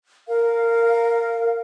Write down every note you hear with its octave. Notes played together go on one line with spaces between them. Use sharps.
A#4 F5